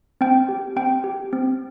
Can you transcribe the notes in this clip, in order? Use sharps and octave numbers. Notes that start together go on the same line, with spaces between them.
C4 G5
G4
C4 G5
G4
C4